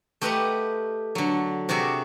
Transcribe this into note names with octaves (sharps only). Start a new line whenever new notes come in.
A3 G4 B4 D#5 F#5 A#5
D3 F#3
C3 F#4 G#4 D5 E5